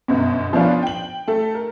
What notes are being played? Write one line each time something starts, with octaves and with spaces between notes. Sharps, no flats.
G1 F#2 B2
F3 B3 C#4 D4 F4
G5 F#7
A3 A4
A#4